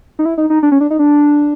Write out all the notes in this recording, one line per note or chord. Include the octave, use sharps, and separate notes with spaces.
D#4
E4
D#4
D#4
D4
C#4
D4
D#4
D4